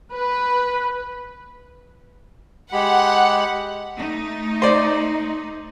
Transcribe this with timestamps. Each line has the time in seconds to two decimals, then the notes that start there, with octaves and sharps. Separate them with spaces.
0.12 B4
2.73 G#3 G4 F#5 B5
3.98 A3 D#4
4.62 C5 D5